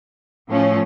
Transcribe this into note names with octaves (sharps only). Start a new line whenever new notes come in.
A2 F3 A3 C#4